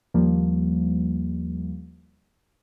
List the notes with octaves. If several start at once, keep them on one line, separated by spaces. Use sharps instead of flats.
D#2 F3 G3 A#3